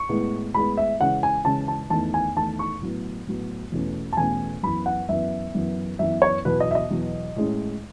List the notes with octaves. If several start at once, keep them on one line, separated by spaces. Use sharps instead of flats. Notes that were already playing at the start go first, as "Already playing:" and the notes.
Already playing: C#6
A2 G#3 B3
A2 G#3 B3 B5
E5
C#3 E3 G#3 C#4 F#5
G#5
C#3 E3 G#3 C#4 A5
A5
E2 D#3 A3 A5
G#5
E2 D#3 A3 A5
C#6
A2 F#3 B3
A2 F#3 B3
E2 B2 A3 C#4
A5
E2 B2 A3 C#4 G#5
F#2 E3 B3 B5
F#5
F#2 E3 B3 E5
F#2 E3 B3
F#2 E3 B3 E5
C#5
E2 B2 F#3 B4
D#5
E5
D#5
E2 B2 F#3
A2 G#3 C#4